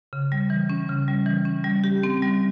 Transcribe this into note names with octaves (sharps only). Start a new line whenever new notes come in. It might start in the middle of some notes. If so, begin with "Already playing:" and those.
C#3
G3
E3
C#4
C#3
G3
E3
C#4
G3
G4
C4
G3